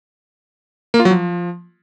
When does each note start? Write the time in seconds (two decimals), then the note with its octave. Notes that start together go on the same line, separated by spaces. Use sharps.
0.94 A#3
1.00 F4
1.05 F#3
1.11 F3